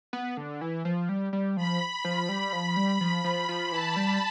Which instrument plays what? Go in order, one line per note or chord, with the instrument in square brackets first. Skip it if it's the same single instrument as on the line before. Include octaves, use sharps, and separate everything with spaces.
[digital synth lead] B3
D3
E3
F3
G3
G3
[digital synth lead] F3 [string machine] B5
[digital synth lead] F3
[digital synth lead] G3 [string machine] B5
[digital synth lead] F3
G3
F3
F3
F3
[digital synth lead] E3 [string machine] A5
[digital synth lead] G3